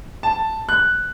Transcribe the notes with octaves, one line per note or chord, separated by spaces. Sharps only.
A5
F#6